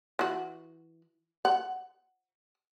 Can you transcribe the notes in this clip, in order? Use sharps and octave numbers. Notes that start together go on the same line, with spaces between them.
E3 F#4
F#5